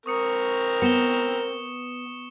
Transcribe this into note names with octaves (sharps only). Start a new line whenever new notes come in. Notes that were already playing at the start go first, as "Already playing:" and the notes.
C4 A#4 C#6 D#6 C#7
B3 C#7 E7 G7